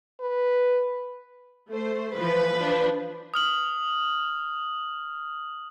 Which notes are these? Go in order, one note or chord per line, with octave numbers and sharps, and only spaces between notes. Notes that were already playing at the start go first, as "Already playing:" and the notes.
B4
A3 C5
E3 F3 B4
F3 D4
D#6 F6 F#7